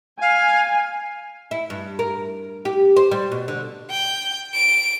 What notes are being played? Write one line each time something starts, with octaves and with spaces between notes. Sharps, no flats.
F5 G#5
E4
G2
A#4
G4
C5
G3
B2
D3
G5
D7